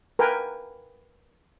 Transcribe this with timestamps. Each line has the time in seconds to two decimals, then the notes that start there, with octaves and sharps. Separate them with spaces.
0.19 A#4 B4 G5 G#5